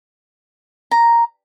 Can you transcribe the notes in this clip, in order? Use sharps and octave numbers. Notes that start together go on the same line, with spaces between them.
A#5